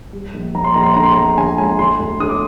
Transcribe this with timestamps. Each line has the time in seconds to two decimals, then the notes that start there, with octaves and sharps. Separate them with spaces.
0.13 G3
0.34 A#1
0.55 A#1 A#5
0.64 C6
0.74 A#1 A#5
0.83 C6
0.94 D3 A#5
1.03 C6
1.13 F2 A#5
1.37 D3 G#5
1.58 G#3 G#5
1.79 D3 C6
2.00 D2
2.20 D3 D#6
2.29 D6